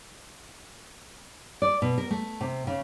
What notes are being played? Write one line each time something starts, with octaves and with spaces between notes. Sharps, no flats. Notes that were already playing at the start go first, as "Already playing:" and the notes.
D5
B2
A#4
A3
C3
C#3